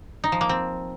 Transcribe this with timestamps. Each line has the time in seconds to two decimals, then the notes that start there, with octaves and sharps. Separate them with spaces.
0.24 D#4
0.32 F3
0.41 A#3
0.49 C4